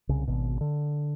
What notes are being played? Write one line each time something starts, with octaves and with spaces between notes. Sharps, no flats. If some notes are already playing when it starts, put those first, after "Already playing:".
C2 C#3
G#1 B2
D3